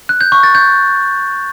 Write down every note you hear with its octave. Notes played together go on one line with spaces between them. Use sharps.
F#6
G6
C#6
A6
G6